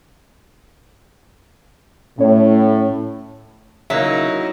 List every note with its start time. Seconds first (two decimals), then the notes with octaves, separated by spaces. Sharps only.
2.19 A2 C#4 C#5
3.90 C#3 F#3 A#3 D#4 E4 E5